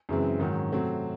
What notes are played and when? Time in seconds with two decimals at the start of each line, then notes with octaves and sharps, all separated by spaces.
0.09 F#2 C#3 E3 G#3 C4
0.40 G#2 D#3 F#3 C#4
0.72 C3 F#3 A3 C4